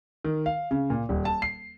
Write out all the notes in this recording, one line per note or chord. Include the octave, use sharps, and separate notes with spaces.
D#3
F5
C#3
A#2
D#1
A5
C7